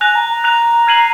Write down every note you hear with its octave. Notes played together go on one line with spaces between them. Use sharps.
G#5 F#6 A#6 F7
A#5
A#5
F#6 A#6 F7
F6 G#6 C7 D#7 F#7